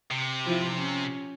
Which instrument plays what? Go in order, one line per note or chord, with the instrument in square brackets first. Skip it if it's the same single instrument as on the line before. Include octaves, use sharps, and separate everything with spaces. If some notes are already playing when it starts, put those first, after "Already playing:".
[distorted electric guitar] C3
[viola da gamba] F3 E4 F4
C#4